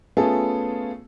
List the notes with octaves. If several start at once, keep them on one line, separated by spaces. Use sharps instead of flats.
A3 B3 C#4 F4 G#4 A4